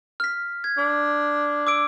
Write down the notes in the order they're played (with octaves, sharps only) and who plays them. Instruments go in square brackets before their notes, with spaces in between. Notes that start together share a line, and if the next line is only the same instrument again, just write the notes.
[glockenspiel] F6 B6
G#6
[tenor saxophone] D4
[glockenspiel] D6 E6 D7